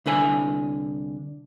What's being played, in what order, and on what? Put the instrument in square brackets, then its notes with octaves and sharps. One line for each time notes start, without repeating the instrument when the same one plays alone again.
[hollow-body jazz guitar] C2 D3 B4 G#5